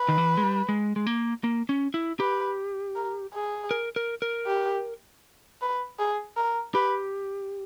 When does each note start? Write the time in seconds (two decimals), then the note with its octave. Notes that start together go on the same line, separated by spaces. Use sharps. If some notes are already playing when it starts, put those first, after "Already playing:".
Already playing: B4
0.09 D#3
0.18 E3
0.37 G#3
0.43 G3
0.69 G#3
0.96 G#3
1.07 A#3
1.44 A#3
1.69 C#4
1.94 E4
2.20 G4 B4
2.96 A#4
3.33 G#4
3.71 A#4
3.96 A#4
4.22 A#4
4.46 G4
5.61 B4
5.99 G#4
6.37 A#4
6.74 G4 B4